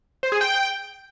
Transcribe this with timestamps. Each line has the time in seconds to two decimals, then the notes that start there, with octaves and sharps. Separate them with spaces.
0.23 C5
0.32 G#4
0.41 G5